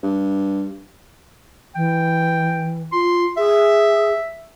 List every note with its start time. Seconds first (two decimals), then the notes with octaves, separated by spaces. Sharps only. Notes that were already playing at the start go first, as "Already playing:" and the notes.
0.03 G2
1.75 E3 G5
2.93 F4 C6
3.37 G#4 E5